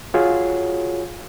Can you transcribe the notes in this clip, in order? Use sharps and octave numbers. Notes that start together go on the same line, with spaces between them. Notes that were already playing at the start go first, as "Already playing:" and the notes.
F4 F#4 G#4 C#5